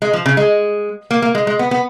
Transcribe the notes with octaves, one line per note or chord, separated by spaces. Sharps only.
G#3
F3
C#3
G#3
A#3
A#3
G#3
G#3
B3
B3